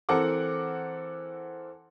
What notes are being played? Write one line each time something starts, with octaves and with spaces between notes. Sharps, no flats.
E3 C4 A4 A#4 F#5 D6